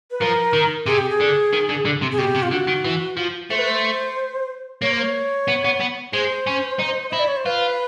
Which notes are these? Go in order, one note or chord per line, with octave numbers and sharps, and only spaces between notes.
B4
F3 A#4
D#3
C3 G#4
G4
G#4
D3
D#3
D3
D3
C3
G#4
B2 G4
C3
F4
D3 F#4
D#3
E3
F3
A3 C5
B4
C5
A#3 C#5
C5
C#5
B3
B3
B3
G#3 C5
C#4
D#4
E4 D#5
D5
C#5
C5
F4 B4